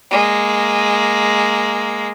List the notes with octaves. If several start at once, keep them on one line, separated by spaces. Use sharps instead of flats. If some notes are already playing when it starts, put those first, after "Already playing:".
G#3 A#3